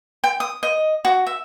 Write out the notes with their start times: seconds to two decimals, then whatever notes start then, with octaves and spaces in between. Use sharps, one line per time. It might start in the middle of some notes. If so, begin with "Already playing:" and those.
0.24 G5
0.40 D#6
0.63 D#5
1.05 F#4
1.27 E5